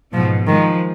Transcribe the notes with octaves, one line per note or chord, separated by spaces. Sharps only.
G#2 B2 F3
D#3 F3 G#3